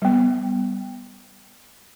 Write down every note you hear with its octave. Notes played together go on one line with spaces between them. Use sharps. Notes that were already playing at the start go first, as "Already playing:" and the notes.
G3 B3